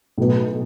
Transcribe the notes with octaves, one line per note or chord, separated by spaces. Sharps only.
B1 A2 F#3 B3